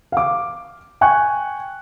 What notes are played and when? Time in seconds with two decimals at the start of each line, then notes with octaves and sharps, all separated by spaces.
0.12 F5 D6
1.01 G5 G#5 C#6 F#6